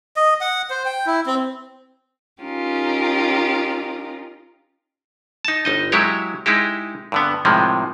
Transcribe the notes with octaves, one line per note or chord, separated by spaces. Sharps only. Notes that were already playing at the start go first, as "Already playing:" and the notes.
D#5
F#5
C5
G5
E4
C4
C#4 D#4 F4 G4 A#4
D#4 A5
G1 D#4 D#5
F#3 G#3 E4 G4 C#5
G#3 D#4 E4 G4
G2 D3 B3
A2 C3 D#3 F3 G#3